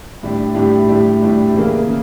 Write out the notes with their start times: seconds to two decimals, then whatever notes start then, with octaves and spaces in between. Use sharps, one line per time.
0.23 A2 G3 D4 G4
0.55 A2 G3 D4 G4
0.88 A2 G3 D4 G4
1.21 A2 G3 D4 G4
1.54 C#3 E3 A#3
1.87 C#3